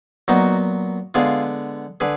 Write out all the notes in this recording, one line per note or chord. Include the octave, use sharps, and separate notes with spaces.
A#2 F#3 B3 D#4 F#4
D3 G#3 B3 F4 G#4
D3 G#4 B4